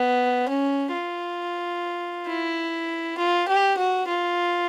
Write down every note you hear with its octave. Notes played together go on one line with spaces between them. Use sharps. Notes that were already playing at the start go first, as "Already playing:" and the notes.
Already playing: B3
C#4
F4
E4
F4
G4
F#4
F4